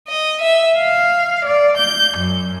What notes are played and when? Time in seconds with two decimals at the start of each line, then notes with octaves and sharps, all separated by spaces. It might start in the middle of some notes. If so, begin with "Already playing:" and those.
0.10 D#5
0.42 E5
0.78 F5
1.46 D5
1.77 G6
2.18 F#2